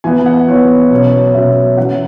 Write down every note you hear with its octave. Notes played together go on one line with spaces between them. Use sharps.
E3 B3 G#5
F#5
E3 B3 C#5
B2 F#3 C#4
B2 F#3 C#4 E5
E3 C#4 F#5